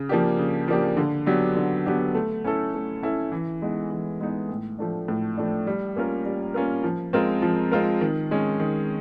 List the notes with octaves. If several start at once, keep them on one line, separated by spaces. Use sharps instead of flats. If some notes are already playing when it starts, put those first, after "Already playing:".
Already playing: C#3
F3 A#3 D4 G4
C#3
F3 A#3 D4 G4
D3
F#3 B3 D4 G4
D3
F#3 B3 D4 G4
A3
C#4 E4 A4
A3
C#4 E4 A4
E3
G#3 B3 D#4
E3
G#3 B3 D#4
A2
F3 A3 D4
A2
F3 A3 D4
G3
A#3 C#4 F4 A#4
G3
A#3 C#4 F4 A#4
F3
G#3 C4 F4 A#4
F3
G#3 C4 F4 A#4
D#3
G#3 C#4
D#3